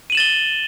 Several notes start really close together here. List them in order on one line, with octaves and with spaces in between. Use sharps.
D#7 F#7 E7 A6 G7